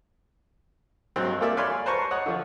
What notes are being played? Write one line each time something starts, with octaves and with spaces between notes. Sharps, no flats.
G2 F#3 G#3 C4
A#3 F4 G#4 A4 D5 E5
C#5 D5 F5 G#5 B5 C6
B4 C5 A5 A#5 C#6
C#5 D#5 F#5
D3 F3